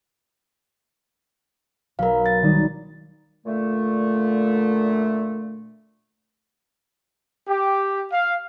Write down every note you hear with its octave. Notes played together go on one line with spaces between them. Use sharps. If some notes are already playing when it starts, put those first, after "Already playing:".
B1 A#4 F5 A#5
A6
D#3 G3 D#4
A#2 D3 A3
G4
F5